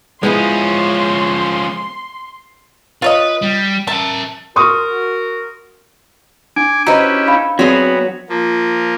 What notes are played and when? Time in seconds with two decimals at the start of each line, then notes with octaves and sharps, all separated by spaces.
0.23 F3 G#3 B3 C#4 E4 C6
3.02 F4 B4 C#5 D#5
3.42 G3
3.87 A#4 E5 A5
4.56 F#4 A#4 C6 C#6 D#6
6.56 D4 G#5 D6
6.86 C#4 E4 F#4 G4 B4 C5 D#5 A#5
7.28 D4 F5 B5
7.59 F#3 B3 C4 F#4 G#4 D5
8.29 F3 A#3